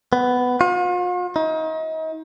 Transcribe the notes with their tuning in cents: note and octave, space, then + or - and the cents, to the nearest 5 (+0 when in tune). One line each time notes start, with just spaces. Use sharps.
B3 +10
F4 +45
D#4 +35